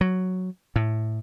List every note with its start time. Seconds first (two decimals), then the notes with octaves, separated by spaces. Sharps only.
0.01 F#3
0.76 A2